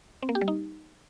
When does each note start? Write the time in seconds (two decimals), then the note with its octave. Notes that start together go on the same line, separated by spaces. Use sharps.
0.23 C4
0.29 A#3
0.35 G4
0.41 G3
0.48 D#4